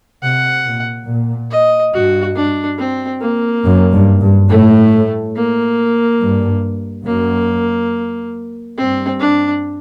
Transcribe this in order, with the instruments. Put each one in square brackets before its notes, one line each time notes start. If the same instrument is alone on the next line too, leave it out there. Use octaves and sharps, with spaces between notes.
[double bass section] C3 [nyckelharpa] F#5
[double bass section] A#2
A#2
[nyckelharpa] D#5
[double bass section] G2 [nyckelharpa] F#4
[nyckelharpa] D4
C4
A#3
[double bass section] F#2
G2
G2
[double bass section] A2 [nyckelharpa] A3
[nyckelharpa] A#3
[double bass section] G2
[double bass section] F#2 [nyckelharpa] A#3
[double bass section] G2 [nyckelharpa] C4
[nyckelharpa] D4